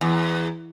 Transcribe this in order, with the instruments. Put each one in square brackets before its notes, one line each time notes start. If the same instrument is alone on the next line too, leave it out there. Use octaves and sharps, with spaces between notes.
[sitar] E2